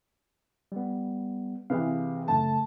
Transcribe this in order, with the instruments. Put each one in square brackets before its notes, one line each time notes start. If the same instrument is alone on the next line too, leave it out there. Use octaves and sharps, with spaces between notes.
[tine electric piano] G3 B3
[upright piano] C3 E3 [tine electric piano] G#4 B4 F5
[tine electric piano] F#2 C#3 A3 [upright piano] A5